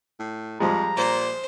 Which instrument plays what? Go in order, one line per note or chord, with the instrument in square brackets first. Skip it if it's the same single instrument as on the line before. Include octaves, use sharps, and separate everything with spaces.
[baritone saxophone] A2
[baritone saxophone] F2 [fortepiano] F3 G3 G#3 [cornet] A#5
[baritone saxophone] A#2 [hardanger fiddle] C5